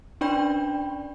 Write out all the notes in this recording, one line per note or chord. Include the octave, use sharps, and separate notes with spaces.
C#4 D4 D5 G5 B5